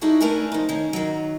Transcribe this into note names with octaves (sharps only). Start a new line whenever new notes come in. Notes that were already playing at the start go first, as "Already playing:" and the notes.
G3 D#4 E4 F#4 G#4 A4
A3 D4 A#4 B4 G#5
F3 D#4
D#3 C#4
D#3 F#3